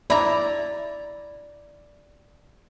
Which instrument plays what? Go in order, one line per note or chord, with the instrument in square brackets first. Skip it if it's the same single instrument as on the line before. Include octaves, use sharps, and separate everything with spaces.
[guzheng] E4 A#5 [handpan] D5